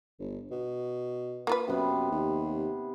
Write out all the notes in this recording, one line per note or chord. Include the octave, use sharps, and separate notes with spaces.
G1
B2
A#3 F4 B4
F#2 C3 B3
D#2